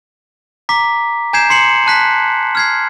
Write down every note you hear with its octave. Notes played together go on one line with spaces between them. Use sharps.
A#5 D6 B6
G#5 A#5 G6 G#6 C7 E7
C6 C7 C#7 F#7
A5 F#6 B6
F6 G#6 C7